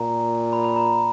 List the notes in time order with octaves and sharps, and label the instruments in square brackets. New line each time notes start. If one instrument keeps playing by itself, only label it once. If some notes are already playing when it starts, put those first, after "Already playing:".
Already playing: [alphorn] A#2 [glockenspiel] A#5
[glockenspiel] B5
B5
A#5